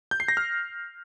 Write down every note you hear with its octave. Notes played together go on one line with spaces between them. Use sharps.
G6
C7
A#6
F6